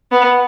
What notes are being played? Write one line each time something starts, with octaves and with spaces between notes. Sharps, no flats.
B3